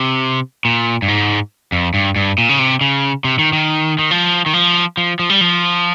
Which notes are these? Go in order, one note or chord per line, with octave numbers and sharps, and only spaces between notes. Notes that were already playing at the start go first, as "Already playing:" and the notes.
Already playing: C3
A#2
G2
G#2
F2
G2
G2
A#2
C#3
C3
C#3
C3
D#3
D#3
D#3
F3
D#3
F3
F3
F3
G3
F3